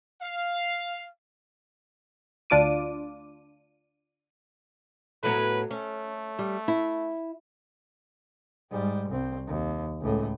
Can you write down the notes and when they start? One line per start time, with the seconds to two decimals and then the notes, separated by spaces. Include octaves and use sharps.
0.22 F5
2.50 D2 D4 F4 D6 D#7
5.23 A2 F#3 B3 B4
5.71 A3 C#4
6.39 G3
6.68 E4
8.71 G#2 G3
9.09 C2 C4
9.48 D#2
10.01 C#2 A2